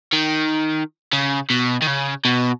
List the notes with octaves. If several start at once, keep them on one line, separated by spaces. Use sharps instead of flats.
D#3
C#3
B2
D#3
C#3
B2